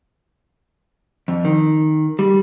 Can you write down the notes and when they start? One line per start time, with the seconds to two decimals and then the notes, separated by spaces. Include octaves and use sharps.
1.28 F2
1.45 D#3
2.19 G3